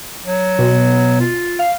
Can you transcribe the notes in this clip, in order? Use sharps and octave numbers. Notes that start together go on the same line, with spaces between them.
F#3
B2
F4
F5